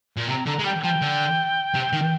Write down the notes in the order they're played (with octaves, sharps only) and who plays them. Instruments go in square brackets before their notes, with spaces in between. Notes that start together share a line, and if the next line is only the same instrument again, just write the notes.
[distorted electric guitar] A#2
[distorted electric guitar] C3 [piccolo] A#5
[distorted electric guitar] D3 [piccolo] A#5
[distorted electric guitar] G#3
[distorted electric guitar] G3 [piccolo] G5
[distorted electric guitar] F3 [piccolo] G5
[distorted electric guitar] D3
C3
D#3